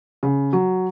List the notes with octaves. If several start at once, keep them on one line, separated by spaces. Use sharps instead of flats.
C#3
F#3